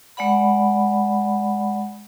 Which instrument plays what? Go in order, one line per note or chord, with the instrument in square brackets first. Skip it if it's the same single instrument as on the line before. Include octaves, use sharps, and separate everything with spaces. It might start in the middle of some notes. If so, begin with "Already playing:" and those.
[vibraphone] G#3 D5 F#5 B5